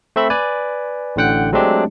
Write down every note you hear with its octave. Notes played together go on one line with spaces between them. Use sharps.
A3 C4 E5 B5
B4 D5 G#5
A1 A2 D3 F#5 G5 F#6
F#3 G#3 A3 C4 D4 G4